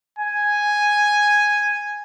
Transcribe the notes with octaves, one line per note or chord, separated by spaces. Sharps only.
G#5